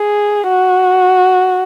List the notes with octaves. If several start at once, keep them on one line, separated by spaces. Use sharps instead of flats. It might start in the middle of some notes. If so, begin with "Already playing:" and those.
Already playing: G#4
F#4